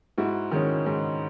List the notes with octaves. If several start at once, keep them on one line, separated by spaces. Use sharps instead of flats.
G#2 E4 F#4
D#3 G#3 C#4
G#2